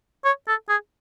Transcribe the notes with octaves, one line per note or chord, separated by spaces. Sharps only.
C#5
A4
G#4